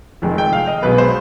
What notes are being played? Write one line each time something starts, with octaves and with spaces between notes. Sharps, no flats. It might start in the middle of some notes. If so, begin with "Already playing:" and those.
F1 F2 D#3 G#3
G5
F5
D#5
B1 B2 G#3 B3 B4
C5